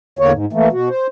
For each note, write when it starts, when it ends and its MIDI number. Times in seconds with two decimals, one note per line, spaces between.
0.19 0.32 40
0.19 0.32 50
0.19 0.32 58
0.19 0.32 73
0.32 0.45 44
0.53 0.68 52
0.53 0.68 57
0.53 0.68 58
0.72 0.89 47
0.72 0.89 66
0.89 1.07 72